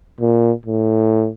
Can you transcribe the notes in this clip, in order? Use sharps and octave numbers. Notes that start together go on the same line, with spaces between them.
A#2
A2